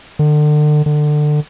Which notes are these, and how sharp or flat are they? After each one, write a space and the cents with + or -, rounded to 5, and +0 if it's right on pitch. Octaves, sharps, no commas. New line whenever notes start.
D3 +35
D3 +25